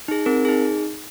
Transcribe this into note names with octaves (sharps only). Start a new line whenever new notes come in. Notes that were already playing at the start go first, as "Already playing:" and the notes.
D#4 G#4
C4 A#4
D#4 G#4